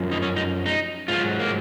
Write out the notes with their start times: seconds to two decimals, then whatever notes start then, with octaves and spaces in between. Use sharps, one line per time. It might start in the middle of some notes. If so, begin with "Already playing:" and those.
Already playing: F#2 F3
0.11 D#4
0.22 C#4
0.36 D#4
0.66 D#4
1.08 G#2 F#3 F4
1.40 A#3